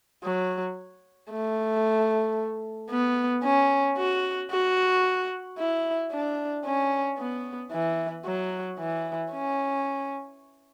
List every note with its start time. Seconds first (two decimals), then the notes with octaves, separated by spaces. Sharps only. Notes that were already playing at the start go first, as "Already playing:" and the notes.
0.24 F#3
1.31 A3
2.90 B3
3.44 C#4
3.98 F#4
4.51 F#4
5.58 E4
6.12 D4
6.65 C#4
7.18 B3
7.72 E3
8.25 F#3
8.79 E3
9.32 C#4